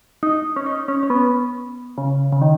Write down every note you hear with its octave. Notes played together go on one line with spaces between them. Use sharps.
D#4
C#4
D#4
C#4
C#4
B3
C#3
C#3
D#3